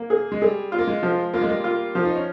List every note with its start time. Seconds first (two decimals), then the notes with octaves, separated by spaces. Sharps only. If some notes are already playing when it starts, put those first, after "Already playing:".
Already playing: A#3
0.10 G#4
0.32 G#3
0.41 G3 G#4
0.72 F4
0.78 A#3
0.87 G#3
1.03 F3
1.34 A#3 F4
1.41 G#3
1.49 G3 A#3
1.64 F4
1.95 F3
2.05 D#4
2.15 C#4